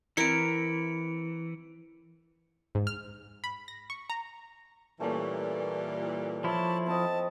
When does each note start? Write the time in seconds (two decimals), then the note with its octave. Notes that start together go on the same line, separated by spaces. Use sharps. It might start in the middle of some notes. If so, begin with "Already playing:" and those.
0.17 E3 C4 E4 A#4 C#7 D7
2.75 G#2
2.87 F6
3.44 B5
3.68 A#6
3.90 C#6
4.10 A#5
5.00 A#2 E3 G3 A3 A#3 C#4
6.44 F3 E4 C#5 E5 A5
6.86 C4 D#5 A5